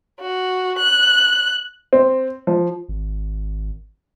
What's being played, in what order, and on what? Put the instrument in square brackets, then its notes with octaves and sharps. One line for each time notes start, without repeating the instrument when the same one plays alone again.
[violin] F#4
F#6
[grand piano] C4
F3
[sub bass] G#1